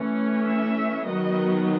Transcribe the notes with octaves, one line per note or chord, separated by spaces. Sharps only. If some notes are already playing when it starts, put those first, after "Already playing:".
Already playing: E3 A3 C#4
E5
D#3 F#3 B3 D#5